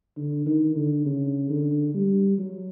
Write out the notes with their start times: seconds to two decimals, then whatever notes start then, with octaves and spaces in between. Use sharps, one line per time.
0.17 D3
0.46 D#3
0.76 D3
1.06 C#3
1.50 D3
1.94 G3
2.38 F#3